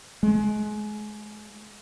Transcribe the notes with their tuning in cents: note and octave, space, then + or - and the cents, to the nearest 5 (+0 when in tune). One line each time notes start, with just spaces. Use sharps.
G#3 +30